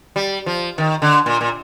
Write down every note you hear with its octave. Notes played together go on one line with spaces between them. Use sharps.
G3
F3
D#3
D3
A#2
A#2